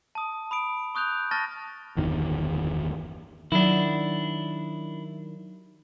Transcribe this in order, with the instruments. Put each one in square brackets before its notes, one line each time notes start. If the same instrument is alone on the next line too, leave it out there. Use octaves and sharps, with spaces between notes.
[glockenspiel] A5 D#6
B5 D#6 D7
C#6 D#6 F#6 G6 F7
A5 C#6 F6 A6 A#6
[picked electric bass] D1 G1 E2 D#3
[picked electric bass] D#3 [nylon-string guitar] F#3 G4 F#5 [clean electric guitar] D4 E4